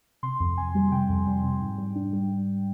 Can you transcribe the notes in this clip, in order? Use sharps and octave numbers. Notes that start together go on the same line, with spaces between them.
C3 C6
F2
F2 G#5
G3
C3 G5
F2
G3
C3
G#2
G3
D4
G3